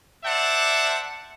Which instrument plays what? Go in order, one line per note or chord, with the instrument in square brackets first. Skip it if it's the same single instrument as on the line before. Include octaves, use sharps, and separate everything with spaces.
[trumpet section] C5 D5 E5 F#5 A5